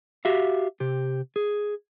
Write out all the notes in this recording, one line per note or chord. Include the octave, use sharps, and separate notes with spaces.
F#4 G4 E5 F5
C3 G4
G#4